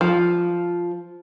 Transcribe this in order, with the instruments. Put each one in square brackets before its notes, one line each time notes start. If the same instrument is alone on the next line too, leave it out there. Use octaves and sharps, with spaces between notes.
[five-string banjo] F3